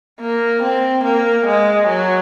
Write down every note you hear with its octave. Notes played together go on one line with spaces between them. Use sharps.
A#3
C4
A#3
G#3
F#3